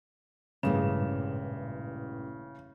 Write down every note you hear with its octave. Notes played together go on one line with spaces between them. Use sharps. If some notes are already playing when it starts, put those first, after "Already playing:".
A1 G2 A#2 C#3 G#3 E7